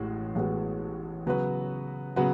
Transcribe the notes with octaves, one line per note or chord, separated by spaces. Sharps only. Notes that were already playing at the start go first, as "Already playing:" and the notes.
Already playing: A1 A2 G#3 F#4
A1 A2 G#3 B3 F#4
C#3 F#3 B3 F#4 B4
C#3 F#3 B3 F#4 B4